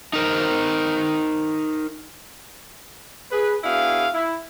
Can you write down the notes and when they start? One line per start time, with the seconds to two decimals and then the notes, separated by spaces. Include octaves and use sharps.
0.13 D#4 A#4 C5
3.32 G#4 B4
3.64 B3 D4 E4 F#4 G#4 F5
4.14 E4